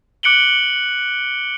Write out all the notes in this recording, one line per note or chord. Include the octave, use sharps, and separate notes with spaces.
D6 F#6 C#7 D7 F#7 G7